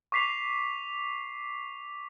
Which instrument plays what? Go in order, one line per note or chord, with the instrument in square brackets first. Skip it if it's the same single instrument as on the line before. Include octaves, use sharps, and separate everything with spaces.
[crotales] C#6 D6 B6 C7 F7